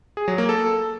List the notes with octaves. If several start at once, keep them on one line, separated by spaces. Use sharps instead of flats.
G#4
F#3
A#3
A4